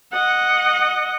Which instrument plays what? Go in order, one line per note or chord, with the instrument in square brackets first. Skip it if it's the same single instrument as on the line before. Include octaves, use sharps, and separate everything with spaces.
[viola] D#5 F#5